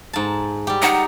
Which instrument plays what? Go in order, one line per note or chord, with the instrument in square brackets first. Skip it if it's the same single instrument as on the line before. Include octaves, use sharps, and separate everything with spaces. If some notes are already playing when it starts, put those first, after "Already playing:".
[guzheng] G#2 A5
G3 G4
[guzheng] D#4 [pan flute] F#5